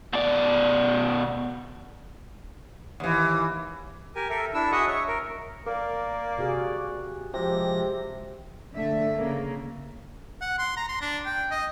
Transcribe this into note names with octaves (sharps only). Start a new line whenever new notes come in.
B2 D5
D#2 E3
G4 A#4 G#5
A4 A#4 E5
D4 E4 E6
F#4 G#4 D#5 E5 F#5
C#5 E5
A#4
A#3 A#4 D5
C3 F#4 G#4
C3 F3 G#3 G4 A#6
D3 A3 E5
C#3 A#3
F#5
C6
A#5
C6
D4
G5
D#5